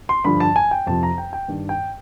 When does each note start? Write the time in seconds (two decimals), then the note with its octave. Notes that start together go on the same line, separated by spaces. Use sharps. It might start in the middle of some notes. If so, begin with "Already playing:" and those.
0.09 C6
0.24 G2 D3 F3 B5
0.40 A5
0.56 G#5
0.71 G5
0.87 F2 C3 F3 A5
1.03 A#5
1.18 G5
1.33 G5
1.48 G2 D#3
1.69 G5